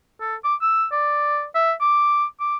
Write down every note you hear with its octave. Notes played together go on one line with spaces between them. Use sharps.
A4
D6
E6
D5
E5
D6
D6